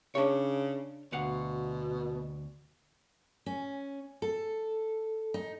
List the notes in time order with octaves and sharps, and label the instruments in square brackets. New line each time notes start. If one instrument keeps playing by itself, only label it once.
[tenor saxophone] C#3 [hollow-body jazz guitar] D4 C#5
[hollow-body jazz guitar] D2 F5 F#5 [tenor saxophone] B2
[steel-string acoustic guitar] C#4
A4
D#4